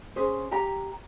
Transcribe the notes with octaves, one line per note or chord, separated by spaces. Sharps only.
C#4 G#4 C5
G4 G5 A#5